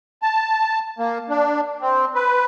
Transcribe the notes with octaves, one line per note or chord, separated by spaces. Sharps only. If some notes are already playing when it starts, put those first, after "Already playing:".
A5
A#3
D4
C4
B4